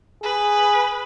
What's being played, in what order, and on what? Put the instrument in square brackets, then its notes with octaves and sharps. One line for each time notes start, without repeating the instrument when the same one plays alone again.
[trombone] G#4 [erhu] B4